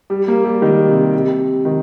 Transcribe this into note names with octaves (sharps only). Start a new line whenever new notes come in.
G3
A#3
G3
D#3
C3
C3
D#3